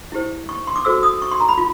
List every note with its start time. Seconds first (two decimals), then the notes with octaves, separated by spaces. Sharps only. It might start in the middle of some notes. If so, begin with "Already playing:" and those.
0.12 E4 G4 C5
0.49 C#6
0.67 C6
0.76 D6
0.85 F#4 A4 C5 E6
1.03 D#6
1.22 C#6
1.32 C6
1.40 A#5
1.49 B5
1.58 F4